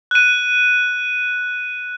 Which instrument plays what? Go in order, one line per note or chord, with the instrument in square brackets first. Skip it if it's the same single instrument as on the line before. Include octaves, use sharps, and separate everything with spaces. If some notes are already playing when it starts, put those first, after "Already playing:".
[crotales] F#6 D#7